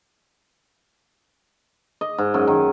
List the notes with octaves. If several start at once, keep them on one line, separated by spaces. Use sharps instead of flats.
D#5
G#2
F#2
D#3